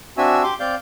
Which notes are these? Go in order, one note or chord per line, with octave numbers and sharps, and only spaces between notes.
C4 D4 F#4 E5 G#5 E6
G4 C6 D6
C4 D5 F5 G6